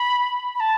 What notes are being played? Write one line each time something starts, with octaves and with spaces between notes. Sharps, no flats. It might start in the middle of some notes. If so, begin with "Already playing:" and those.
Already playing: B5
B5
A5